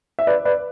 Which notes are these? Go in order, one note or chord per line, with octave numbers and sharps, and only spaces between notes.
E5
B4 D5
B4 D5